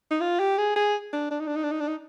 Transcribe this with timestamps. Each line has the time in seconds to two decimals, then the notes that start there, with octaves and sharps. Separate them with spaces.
0.11 D#4
0.21 F4
0.40 G4
0.58 G#4
0.76 G#4
1.13 D4
1.31 D4
1.40 D#4
1.47 D4
1.56 D#4
1.64 D4
1.72 D#4
1.81 D4
1.88 D#4